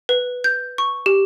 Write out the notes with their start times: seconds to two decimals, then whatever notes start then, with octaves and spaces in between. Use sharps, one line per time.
0.09 B4
0.44 G6
0.78 C#6
1.06 G4